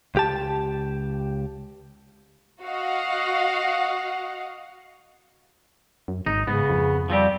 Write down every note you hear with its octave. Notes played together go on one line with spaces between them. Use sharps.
C#2 G4 A5
F#4 D#5 F5 F#5
F#2
G#1 D#4
G#2 C#3 B3
F2
F3 G3 C4 G4